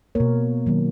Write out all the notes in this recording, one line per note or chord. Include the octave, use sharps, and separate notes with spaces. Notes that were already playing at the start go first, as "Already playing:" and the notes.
B2 A#3 A#4 C#5
D#3 F#3 A#3